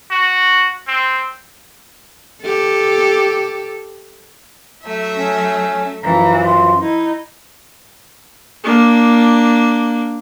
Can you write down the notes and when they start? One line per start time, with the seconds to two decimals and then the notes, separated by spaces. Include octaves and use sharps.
0.11 F#4
0.88 C4
2.43 G4 A4
4.83 F#3 A3 E5
5.17 C#4
6.03 F#2 E3 F3 A#5
6.45 C6
6.80 D#4 E4
8.64 A#3 D4